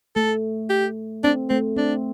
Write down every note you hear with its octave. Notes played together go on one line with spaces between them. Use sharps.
A3 A4
G4
C4 D4
A3 C4
C4 D4